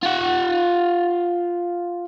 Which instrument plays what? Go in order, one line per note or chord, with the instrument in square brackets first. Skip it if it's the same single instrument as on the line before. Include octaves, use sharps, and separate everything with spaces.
[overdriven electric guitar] F4 F#5